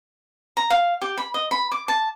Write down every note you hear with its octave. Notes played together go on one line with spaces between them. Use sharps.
A#5
F5
G4
B5
D#5
B5
D6
A5